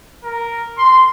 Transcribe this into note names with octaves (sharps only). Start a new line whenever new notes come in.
A#4
C6